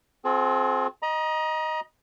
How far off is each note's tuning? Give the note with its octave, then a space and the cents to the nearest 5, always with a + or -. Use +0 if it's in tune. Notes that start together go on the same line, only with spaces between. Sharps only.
C4 +0 F4 +35 G#4 +45
D#5 +0 A#5 +35